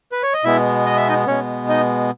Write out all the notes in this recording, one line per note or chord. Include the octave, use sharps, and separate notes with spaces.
B4
C#5
D#5
B2 G#3 B3 E4 E5
D#5
E5
D#4 D#5
B2 G#3 B3 C#4 C#5
D#4 D#5